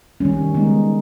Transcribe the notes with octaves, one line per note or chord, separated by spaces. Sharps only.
D#3 G3 C#4
G#3 B3 D#4